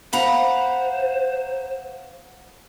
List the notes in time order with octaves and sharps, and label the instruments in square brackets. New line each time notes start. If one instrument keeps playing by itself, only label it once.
[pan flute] C5 [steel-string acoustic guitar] F5 F#5 A#5 [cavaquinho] B5